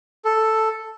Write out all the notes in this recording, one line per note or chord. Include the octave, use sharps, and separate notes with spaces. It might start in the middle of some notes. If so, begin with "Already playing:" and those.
A4